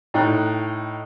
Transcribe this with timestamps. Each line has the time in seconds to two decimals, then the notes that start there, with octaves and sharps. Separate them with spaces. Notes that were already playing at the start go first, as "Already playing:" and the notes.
0.14 A2 D#4 G5 F#6